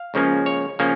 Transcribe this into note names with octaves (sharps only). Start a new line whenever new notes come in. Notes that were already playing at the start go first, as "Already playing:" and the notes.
Already playing: F5
C#2 C#3 F3 A#3 C#4
C#5
C#3 F3 A#3 C#4